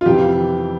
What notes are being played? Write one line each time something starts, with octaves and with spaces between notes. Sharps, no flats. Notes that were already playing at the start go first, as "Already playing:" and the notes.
F4
F2 C3 E3 G4